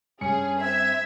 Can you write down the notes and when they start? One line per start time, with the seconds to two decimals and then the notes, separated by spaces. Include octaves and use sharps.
0.21 G2 C#4 G#4 C#7
0.61 C4 E5 G#6